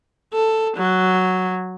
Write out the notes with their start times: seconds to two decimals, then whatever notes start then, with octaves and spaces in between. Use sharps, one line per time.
0.34 A4
0.77 F#3